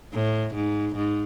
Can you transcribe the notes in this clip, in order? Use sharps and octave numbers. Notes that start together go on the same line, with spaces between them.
A2
G#2
G#2